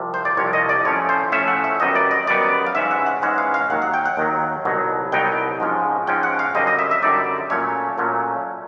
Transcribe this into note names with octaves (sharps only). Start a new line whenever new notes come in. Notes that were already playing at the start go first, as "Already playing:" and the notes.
Already playing: C2 C3 F3
C5
D5
C2 C3 F3 C#5
D#5
D5
A2 F3 A3 C#4 C#5
C5
A2 F3 A3 C#4 E5
F#5
E5
F#2 D#3 G3 B3 D#4 D#5
D5
D#5
F#2 D#3 G3 B3 D#4 D5
F5
G#2 E3 G#3 C#4 E5
F#5
F#5
G#2 E3 G#3 C#4 F#5
F5
F5
D#2 D#3 F#3 F#5
F#5
G5
F#5
D#2 D#3 F#3
C2 B2 F#3 B3 D#4
C2 B2 F#3 B3 D#4 G5
G#2 F3 G#3 C#4
G#2 F3 G#3 C#4 G5
F#5
F5
F#2 D3 G3 C4 D#4 D#5
D#5
E5
E5
F#2 D3 G3 C4 D#4 D5
A#2 F#3 A3 C#4 C#5
A#2 F#3 A3 C#4